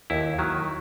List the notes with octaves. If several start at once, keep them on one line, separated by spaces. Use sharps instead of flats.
D#2 E4
D#3 F#3